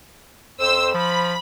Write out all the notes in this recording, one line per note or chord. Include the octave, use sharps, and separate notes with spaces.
F2 C5 E6
F3 B5